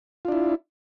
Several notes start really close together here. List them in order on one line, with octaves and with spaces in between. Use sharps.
F4 D4 E4